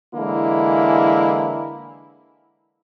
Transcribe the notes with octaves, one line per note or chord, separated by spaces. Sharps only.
D3 E3 G#3 A#3 E4